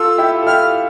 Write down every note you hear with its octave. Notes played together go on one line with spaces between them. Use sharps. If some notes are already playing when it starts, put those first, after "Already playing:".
Already playing: F4 A4 E6
E4 G4
A4
E4 G4 F6